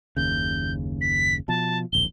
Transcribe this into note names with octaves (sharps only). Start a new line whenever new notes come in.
F#1 D#2 C#3 G6
B6
B2 F3 A5
D1 A#1 G7